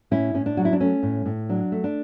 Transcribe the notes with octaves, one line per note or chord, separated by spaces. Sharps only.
A2 C#4 E4
A2 C#4
D4
F#3 F#4
E4
D4
A3 C#4
A2
A2
F#3 D4
A3
D4